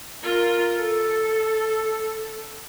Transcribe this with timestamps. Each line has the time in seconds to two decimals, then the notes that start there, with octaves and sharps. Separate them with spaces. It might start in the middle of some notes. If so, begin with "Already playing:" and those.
0.23 F4 A#4
0.75 A4